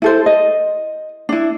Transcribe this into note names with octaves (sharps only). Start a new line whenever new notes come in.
E4 A4 C5
D#5
D4 E4